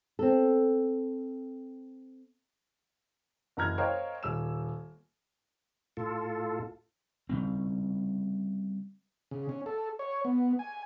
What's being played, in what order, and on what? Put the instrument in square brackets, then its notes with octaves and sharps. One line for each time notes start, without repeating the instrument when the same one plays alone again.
[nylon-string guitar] C4 A4
[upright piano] F#1 E3 A#5 F6 G#6
A#4 C5 C#5 D#5 F5 G5
D#1 E6 E7
[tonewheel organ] A2 F4 A4
[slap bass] C#3 G3 C4
[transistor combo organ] C#3
C#4
A4
C#5
B3
G#5